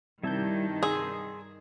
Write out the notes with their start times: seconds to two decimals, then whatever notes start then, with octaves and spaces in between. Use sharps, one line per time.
0.24 G2 C3 D#3 G3 E4 A5 G6
0.83 G#4 C6 D#6 E6